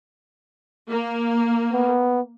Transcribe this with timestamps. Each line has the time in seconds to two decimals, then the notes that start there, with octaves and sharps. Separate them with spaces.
0.89 A#3
1.73 B3